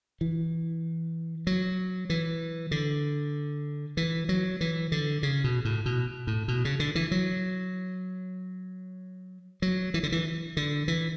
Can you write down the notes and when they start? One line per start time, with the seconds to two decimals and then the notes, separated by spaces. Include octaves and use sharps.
0.21 E3
1.47 F#3
2.10 E3
2.71 D3
3.97 E3
4.29 F#3
4.61 E3
4.92 D3
5.23 C#3
5.44 B2
5.65 A2
5.86 B2
6.27 A2
6.48 B2
6.65 C#3
6.80 D3
6.95 E3
7.11 F#3
9.62 F#3
9.94 E3
10.03 D3
10.12 E3
10.57 D3
10.88 E3